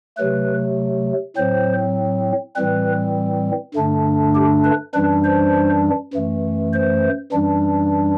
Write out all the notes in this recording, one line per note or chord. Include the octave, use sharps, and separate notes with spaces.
C3 F#3 A3 B4
A2 F#3 C4 C5
A2 E3 G3 C4 B4
G2 D3 A3 D4
G4
B4
F#2 E3 G3 D4 B4
C5
F#2 E3 A3
C5
F#2 E3 G3 D4